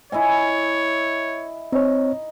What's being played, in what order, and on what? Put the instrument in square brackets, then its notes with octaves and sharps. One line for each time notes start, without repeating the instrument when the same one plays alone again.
[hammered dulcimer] E4 D#5 G#5 [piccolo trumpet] C#5
[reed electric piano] C4 C#5 [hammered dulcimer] D#4